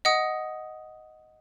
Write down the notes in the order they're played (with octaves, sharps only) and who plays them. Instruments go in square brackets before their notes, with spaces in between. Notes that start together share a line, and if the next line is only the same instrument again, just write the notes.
[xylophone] D#5 F#5 D#6